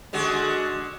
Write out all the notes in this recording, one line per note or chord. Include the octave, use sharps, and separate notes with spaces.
D3 G#3 F#4